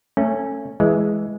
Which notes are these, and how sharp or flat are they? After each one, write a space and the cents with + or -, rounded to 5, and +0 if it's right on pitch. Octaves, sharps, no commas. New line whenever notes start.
A3 +20 C#4 -15
E3 +0 G#3 +0